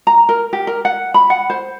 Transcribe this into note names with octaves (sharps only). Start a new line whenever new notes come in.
A#5
A#4
G4
A#4
F#5
B5
F#5
C5